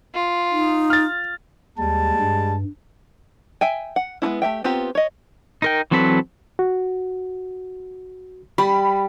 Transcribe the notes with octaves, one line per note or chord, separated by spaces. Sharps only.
F4
D#4
F6 A6
D#2 G3 G#3 A5
G2
E5 G5 G#5
F#5
G#3 B3 C#4 E4
A3 G4 E5 G5
B3 C4 F4 G4 A#5
C#5 D#5
D#4 A#4 G5
E3 F#3 C4 A4 B4
F#4
G3 B5